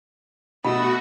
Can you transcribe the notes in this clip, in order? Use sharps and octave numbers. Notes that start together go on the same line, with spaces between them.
B2 A3 F#4 D#5 B5 E6